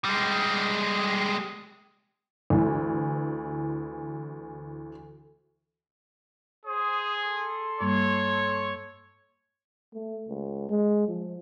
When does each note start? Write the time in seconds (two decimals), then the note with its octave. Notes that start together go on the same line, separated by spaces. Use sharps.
0.05 G3 G#3
2.50 D2 E3
6.65 G#4 C5 D#6
7.24 A4 C6
7.81 G2 G3 A#3 C#5
9.93 A3
10.28 C#2
10.69 G#3
11.08 F3